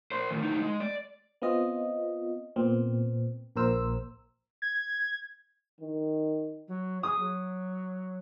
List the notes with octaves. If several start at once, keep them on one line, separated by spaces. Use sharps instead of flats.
A#4 C5
A2 D#3
D2 D#4
G#3
D5
B3 C4 F4 D#5
A#2 B3 C4
A#1 A#2 A#4 C5 E6
G#6
D#3
F#3
G#4 D#6
F#3